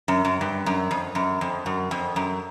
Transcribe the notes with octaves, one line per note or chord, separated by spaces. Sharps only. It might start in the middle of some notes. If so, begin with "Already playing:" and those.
F#2
F#2
G2
F#2
F2
F#2
F2
F#2
F2
F#2